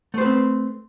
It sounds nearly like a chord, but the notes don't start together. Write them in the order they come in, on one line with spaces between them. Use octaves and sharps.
A3 C5 B4 C4